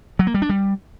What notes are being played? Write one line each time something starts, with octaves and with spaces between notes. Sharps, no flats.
F#3
A#3
G3
D4
G3